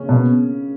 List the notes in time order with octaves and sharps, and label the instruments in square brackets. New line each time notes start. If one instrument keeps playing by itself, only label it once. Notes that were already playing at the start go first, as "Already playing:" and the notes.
Already playing: [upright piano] C#3 C#4
[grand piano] B2